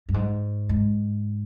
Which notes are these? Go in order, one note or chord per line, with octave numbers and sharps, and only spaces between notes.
G2
G#2
G#2